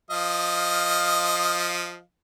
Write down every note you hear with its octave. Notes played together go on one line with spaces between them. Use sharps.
F3 D#5 F5